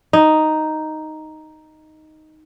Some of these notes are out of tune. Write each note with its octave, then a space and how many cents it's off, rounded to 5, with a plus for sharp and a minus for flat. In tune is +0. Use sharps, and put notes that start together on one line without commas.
D#4 +0